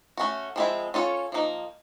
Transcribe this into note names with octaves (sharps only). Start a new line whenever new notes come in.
A3 C#4 F#4
F3 G#3 C4 E4
C#4 F4 A4 C#5
F3 A#3 D#4